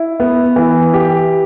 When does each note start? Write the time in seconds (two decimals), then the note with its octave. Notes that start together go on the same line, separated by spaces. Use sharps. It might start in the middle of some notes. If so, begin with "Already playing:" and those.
Already playing: E4
0.20 B3
0.56 E3
0.94 G4